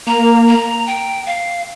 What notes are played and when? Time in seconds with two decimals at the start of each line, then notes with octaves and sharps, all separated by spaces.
0.07 A#3 A#5
0.47 A#5
0.87 G5
1.27 F5